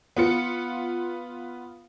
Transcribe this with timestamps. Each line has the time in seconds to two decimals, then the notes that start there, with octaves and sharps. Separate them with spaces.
0.17 B3 F4 C#7